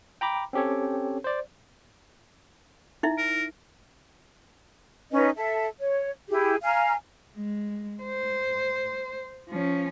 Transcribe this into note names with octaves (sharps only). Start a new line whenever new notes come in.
G5 A#5 B5 D6
C4 C#4 G4 A4 C#5
C5 D5
D#4 E4 E5
A#4
C#4 D#4 B4 D#5
A4 E5
C#5
E4 G4 G#4
F5 G#5 A#5 F6
G#3
C5
F3 C#4